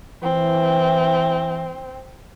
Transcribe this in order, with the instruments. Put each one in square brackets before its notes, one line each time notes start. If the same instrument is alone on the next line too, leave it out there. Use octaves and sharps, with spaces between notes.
[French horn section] E3 [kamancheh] C4